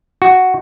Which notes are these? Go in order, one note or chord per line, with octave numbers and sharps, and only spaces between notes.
F#4